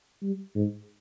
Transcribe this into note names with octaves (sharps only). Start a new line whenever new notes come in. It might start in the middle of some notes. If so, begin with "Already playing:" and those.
G3
G#2